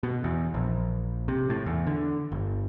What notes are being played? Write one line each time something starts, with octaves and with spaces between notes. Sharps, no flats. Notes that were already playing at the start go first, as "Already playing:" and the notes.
B2
E2
A#1
C3
A2
E2
D3
G1